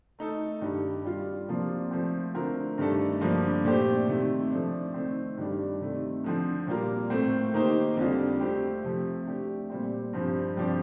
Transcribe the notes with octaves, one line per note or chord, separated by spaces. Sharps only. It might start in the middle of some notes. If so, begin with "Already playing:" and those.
A3 D#4 A4
G2 D#3 G3 D4
G3 D4 F4
C3 F3 A#3 D4 F4
F3 A3 C4
D3 A3 C4 F4 A#4
G2 D#3 A3 D4 A4
G2 D3 F3 A#3 D4
A#2 A3 D4 G4 C5
C3 D#3 A3
F3 A3 D4
D#3 A3 C4
G2 D#3 G3 D4
C3 D#3 A3
D3 F3 C4
A#2 G3 A#3 F4 A#4
A2 A3 C4
D#3 A#3 D#4 G4 C5
F2 D3 G3 D4 F4
A3 C4 G4
C3 F3 A3
A3 D4 G4
A#2 G3 C4
G2 F3 C4
G2 F3 C4 G4 D5